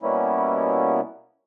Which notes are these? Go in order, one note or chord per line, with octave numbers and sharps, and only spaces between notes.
B2 G3 A#3 B3 C#4 E4